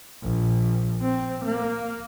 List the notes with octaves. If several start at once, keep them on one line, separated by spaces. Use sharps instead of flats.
A#1
C4
A#3